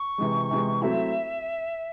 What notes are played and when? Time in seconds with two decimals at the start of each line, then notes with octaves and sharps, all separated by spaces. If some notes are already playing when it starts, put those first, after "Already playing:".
Already playing: C#6
0.18 C3 E3 G#3
0.51 C3 E3 G#3
0.82 F#3 A3 C4 E4 E5